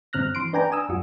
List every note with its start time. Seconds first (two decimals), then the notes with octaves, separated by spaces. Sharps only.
0.13 G2 D3 C4 F6 F#6 A#6
0.35 E3 C6 D7
0.53 D4 B4 D5 G5 G#5 A#5
0.72 G#5 D#6 E6
0.89 F#2 F4 F#4